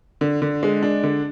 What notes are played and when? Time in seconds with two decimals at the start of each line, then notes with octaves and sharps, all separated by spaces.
0.21 D3
0.42 D3
0.63 G#3
0.83 D4
1.03 D3